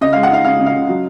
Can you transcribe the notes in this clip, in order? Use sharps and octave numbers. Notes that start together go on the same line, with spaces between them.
C#3 D#5
F5
G#3
F#5
D#4 F5
C#3 F5
C#3
F5
C#3
F#3